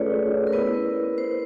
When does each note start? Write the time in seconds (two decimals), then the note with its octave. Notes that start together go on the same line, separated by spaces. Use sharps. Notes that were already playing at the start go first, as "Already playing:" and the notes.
Already playing: A3 C#4 F4 G#4 A4 B4 C#5 D5
0.47 A#4
0.53 B3 E4 B4
1.18 C5